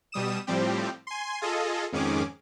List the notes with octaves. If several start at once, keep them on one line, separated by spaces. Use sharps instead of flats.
B2 G3 D#6 E7
A2 F3 G3 C4 G4
G#5 C6
F4 G#4 A4 D#5
F2 G#2 D#3 C#4 G#4 D6